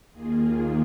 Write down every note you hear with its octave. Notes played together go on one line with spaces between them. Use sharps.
D#2 D#3 A#3 F4 G#4